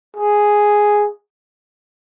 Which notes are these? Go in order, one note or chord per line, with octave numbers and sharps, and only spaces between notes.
G#4